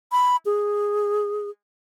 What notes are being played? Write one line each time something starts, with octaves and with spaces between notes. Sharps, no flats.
B5
G#4